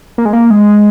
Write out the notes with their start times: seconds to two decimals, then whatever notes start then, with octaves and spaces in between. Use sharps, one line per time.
0.18 A#3
0.26 G#3
0.33 A#3
0.51 G#3